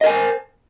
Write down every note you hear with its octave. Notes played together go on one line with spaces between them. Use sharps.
A#4 C5 D#5 G#5